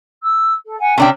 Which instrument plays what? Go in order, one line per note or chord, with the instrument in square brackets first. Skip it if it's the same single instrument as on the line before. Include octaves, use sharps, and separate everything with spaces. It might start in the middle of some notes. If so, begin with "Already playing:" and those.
[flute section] E6
A4
F#5 G#5
[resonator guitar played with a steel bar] C3 D4 G5 [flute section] C#4